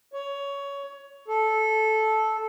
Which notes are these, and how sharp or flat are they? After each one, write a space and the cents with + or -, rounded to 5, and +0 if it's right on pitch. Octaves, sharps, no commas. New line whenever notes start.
C#5 +15
A4 -10